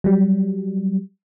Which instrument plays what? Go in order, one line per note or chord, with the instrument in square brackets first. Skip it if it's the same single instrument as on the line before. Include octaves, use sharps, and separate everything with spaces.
[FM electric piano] F#3 G3